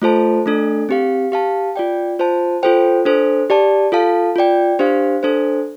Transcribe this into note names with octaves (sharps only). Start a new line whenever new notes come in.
A3 F4 A4 C5 A5
A3 D4 A4
C4 G4 F5
G4 F5 A5
F4 D5 G5
F4 C5 A5
F4 A4 C5 G5
D4 A4 C5
G4 D5 A5
F4 A4 F5 A5
F4 D5 G5
D4 G4 C5 F5
D4 A4 C5